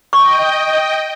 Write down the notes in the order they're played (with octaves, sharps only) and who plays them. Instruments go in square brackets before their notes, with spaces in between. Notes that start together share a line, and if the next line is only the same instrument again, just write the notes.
[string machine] D#5 G5 [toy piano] C#6